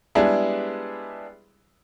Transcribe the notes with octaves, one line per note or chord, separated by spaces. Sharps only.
G3 G#3 B3 D4 E4 G#4